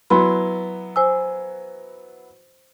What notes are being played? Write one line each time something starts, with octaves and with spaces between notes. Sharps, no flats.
F#3 B3 E4 B5 C6
C5 G#5 E6